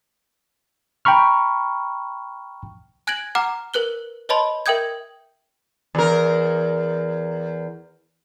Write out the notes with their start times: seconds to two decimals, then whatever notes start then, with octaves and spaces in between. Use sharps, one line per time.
1.05 G5 A#5 B5 C#6 F6
3.07 G#5 F#6 G#6 A#6 D7 F#7
3.35 F#5 A#5 D6 F6
3.74 A#4 B4 F#6 G7
4.29 B4 C#5 D#5 A5 B5 C6
4.66 A#4 E5 G5 D#6 G6 G#6
5.95 E2 A#4